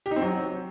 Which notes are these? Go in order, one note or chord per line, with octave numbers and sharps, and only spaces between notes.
G4
D#4
C4
F#3